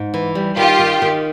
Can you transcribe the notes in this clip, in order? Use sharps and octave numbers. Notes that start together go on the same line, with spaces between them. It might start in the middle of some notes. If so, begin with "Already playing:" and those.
Already playing: G#2
E3
G3
D#3 F4 G4
D#3
D#3